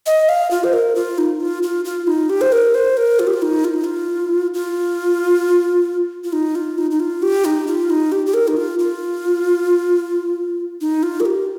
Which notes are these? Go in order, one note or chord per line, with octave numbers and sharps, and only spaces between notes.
D#5
F5
F4
C5
A#4
F4
D#4
F4
F4
F4
D#4
G4
C5
A#4
C5
A#4
F4
G4
F4
D#4
F4
D#4
F4
F4
F4
D#4
F4
D#4
D#4
F4
G4
D#4
F4
D#4
G4
G4
A#4
D#4
F4
F4
D#4
F4
A#4
G4